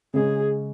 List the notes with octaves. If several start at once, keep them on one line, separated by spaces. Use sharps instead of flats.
C#3 G#3 C#4 G#4